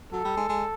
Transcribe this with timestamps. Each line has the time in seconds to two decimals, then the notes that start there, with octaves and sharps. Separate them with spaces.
0.12 F#3 A4
0.24 G3
0.37 G#3
0.49 G#3